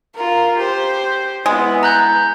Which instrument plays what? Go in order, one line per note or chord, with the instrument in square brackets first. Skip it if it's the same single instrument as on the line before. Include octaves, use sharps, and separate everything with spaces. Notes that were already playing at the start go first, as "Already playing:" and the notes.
[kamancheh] F4 A#4
G4 C5
[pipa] G#3 [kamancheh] B3 E4
[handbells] A#5 F#6 G6